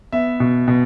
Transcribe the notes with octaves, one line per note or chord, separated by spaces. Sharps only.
B3 E5
B2
B2